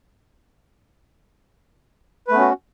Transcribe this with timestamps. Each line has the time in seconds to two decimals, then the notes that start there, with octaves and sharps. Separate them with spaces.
2.28 B4
2.31 A3
2.34 B3
2.37 C#4
2.40 F#4